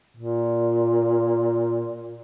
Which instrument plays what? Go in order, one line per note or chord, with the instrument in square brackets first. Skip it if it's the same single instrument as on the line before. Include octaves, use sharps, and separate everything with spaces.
[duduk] A#2